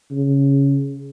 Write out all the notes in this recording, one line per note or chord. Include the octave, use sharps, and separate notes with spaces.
C#3